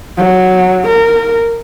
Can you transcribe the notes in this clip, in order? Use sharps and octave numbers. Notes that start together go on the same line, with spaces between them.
F#3
A#4